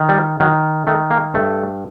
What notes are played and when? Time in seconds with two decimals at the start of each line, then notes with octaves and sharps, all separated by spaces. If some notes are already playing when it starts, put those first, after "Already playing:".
Already playing: D#3
0.09 G3
0.40 D#3 F#3
0.87 D#3 A3
1.10 A#3
1.34 G2 A3